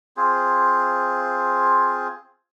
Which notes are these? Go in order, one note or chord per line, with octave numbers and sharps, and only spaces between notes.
C4 F4 G#4 C5